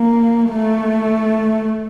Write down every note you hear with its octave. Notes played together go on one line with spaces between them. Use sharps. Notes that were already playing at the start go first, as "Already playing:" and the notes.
Already playing: A#3
A3